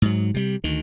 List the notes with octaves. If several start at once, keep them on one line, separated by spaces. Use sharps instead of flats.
G#2 F#3
C3 G3
D2 D#3